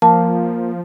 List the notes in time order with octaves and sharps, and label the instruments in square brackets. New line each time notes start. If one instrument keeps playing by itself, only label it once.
[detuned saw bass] F3 [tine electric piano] A#3 [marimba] A5